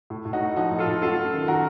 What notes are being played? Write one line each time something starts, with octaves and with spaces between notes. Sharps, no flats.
A2
A2
D#4 F#4
A2
F3 D#4 F#4
A2
F4 A4
A2
F#2 F4 A4
F#2
D#3
D#3 F#4 A#4